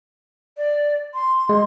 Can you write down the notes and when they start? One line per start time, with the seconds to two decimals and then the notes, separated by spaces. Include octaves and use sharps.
0.58 D5
1.14 C6
1.49 G#3